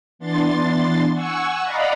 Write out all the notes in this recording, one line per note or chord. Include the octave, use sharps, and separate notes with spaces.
E3 B3 D4 C6 A6
F#5 G#5 C#6 E6
D5 D#5 F5 F#5 A#5 B5